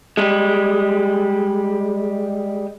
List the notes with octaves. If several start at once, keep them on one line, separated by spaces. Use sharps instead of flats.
G3 G#3